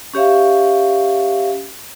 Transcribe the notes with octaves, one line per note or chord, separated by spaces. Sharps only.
C#4 G4 C#5 E5 F5